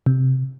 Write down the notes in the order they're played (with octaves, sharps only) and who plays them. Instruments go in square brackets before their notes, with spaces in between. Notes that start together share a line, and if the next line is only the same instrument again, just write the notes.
[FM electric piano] C3